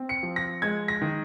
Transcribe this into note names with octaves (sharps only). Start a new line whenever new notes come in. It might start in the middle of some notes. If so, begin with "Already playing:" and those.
Already playing: C4
C#7
F3
A#6
G#3 G#6
A#6
D#3